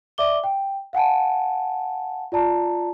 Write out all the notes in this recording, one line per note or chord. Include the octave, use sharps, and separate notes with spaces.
D5 E5 D6 G7
G5
F5 F#5 G#5 A5
F4 D5 A5 A#5